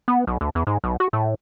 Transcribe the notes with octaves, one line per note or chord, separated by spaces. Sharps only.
B3
B1
D2
E2
G#2
B1
F#4
A2